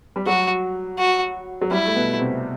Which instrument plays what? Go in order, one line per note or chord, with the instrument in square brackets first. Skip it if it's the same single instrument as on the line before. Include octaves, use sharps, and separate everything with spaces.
[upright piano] G3
[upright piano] F#3 [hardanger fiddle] F#4
[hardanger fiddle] F#4
[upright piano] F#3
[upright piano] G3 [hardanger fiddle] E4
[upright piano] A3
B2 B3
C3 C4